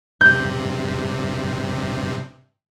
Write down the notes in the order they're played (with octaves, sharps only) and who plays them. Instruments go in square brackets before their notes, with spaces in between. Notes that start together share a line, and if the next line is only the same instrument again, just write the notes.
[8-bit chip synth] G2 C3 [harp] G6